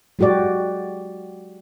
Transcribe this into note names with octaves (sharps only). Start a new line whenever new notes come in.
F#3 G#3 F#4 G4 D5